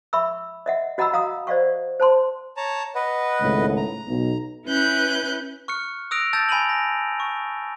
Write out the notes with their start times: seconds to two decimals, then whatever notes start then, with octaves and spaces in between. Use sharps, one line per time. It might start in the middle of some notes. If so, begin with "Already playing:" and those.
0.13 E5 B5 C#6 E6
0.66 D#5 E5 F#5
0.98 F#4 D#5 F#5 A#5 B5 E6
1.13 F5 A#5 D#6
1.47 C5 D5 D#5 F5 F#5 C#6
2.00 C5 A5 C6
2.57 C#5 A5 A#5
2.95 B4 D#5 F#5
3.40 G#1 C#2 A2
3.77 A#5
4.08 B1
4.67 C#4 E4 B4 F#6 G6
5.68 C#6 F6 F#6 C#7
6.11 D#6 E6 F#6 A#6 D7 F7
6.33 A5 E6 G6 A6
6.49 G#5 B5 D7 D#7 F7 F#7
6.69 A#6
7.20 C#6